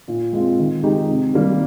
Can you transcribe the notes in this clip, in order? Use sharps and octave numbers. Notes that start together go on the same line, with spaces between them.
A#2
G#3 C4 F4
D#3
G#3 D#4 G4
C3
D#3 G3 A#3